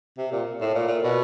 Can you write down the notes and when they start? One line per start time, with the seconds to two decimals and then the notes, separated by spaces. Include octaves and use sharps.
0.18 C3
0.32 A#2
0.61 A2
0.75 A#2
0.88 A#2
1.03 B2